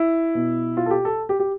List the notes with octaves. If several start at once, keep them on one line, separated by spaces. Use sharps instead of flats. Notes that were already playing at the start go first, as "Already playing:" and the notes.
Already playing: E4
B2
F4
A4
G4
A4
G4
G4